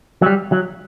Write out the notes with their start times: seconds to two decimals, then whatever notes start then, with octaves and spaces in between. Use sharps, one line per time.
0.22 F#3
0.26 G3
0.52 F#3